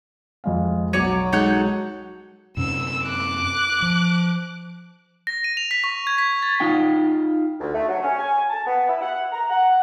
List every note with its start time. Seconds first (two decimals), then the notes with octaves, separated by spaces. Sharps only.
0.44 F2 G#3 F5
0.93 B1 F#3 C#5 D5 D#7
1.32 G#3 D#4 A4 C#5 F#5 G6
2.57 F#2 C3 C#4 E6
3.05 D6 F#6
3.82 F3
5.27 A#6
5.44 D#7
5.57 F7
5.71 B6
5.84 C#6
6.07 G#6
6.18 B6
6.43 A6
6.60 D#4 F4 G5
7.60 D2
7.74 A3
7.89 F#3
8.03 C#4
8.19 G#5
8.50 A5
8.66 B3
8.89 E4
9.01 F#5
9.32 A#5
9.50 F#5